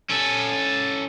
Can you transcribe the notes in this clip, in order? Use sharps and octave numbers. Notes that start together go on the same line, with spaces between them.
C#4 A4